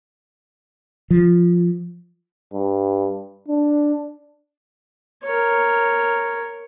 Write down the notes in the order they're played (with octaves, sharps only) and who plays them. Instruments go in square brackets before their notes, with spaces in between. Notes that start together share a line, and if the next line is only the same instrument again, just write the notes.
[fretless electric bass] F3
[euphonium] G2
D4
[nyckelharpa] A#4 C#5